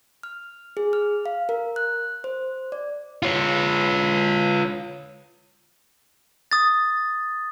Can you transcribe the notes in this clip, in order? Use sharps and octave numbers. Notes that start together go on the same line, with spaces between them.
F6
G#4
F6
F5
A#4
F#6
C5
D5
F4 C#5
D#6 A6